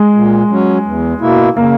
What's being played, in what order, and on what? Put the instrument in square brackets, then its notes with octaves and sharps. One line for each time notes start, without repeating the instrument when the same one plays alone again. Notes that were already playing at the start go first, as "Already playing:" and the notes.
Already playing: [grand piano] G#3
[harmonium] A#2
F#3 C#4
E2
B2 A#3 E4
[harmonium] C#3 [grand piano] A#3